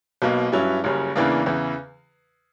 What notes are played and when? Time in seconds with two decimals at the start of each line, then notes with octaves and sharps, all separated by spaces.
0.22 B1 B2 A#3
0.52 G2 F#3 C#4 E4
0.84 F#1 F#2 C#3 G3 C#4
1.16 E2 C#3 E3 A#3 D4
1.46 E2 C#3 E3